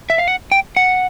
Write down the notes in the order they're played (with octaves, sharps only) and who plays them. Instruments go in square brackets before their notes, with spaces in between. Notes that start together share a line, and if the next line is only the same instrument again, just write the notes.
[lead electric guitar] E5
F5
F#5
G5
F#5